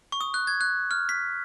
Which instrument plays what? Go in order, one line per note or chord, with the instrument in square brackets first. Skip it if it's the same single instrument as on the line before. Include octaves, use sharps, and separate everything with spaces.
[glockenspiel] C#6
D#6
F#6
G#6
F#6
F6
B6